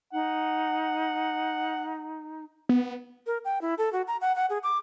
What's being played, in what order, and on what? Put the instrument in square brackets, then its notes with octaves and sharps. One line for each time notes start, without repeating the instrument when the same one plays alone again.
[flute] D#4 [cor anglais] F#5
[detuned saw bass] B3
[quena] A#4
G5
E4
A4
F#4
A#5
F#5
F#5
G#4
D6